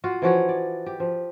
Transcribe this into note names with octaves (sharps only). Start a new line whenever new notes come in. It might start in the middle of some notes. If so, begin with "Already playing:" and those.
F4 F#4
E3 F3 F#4 C#5
D5
G4
F3